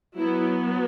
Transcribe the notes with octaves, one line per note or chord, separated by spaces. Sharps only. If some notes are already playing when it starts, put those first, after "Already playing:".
F#3 B3 E4